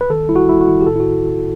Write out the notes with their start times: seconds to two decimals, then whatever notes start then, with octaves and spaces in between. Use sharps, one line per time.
0.01 B4
0.10 D#3 A4
0.29 G3 E4
0.36 F#4
0.48 G3 E4
0.61 F#4
0.68 D#3 E4
0.81 G4
0.87 A2 A4
0.96 E4
1.00 F#4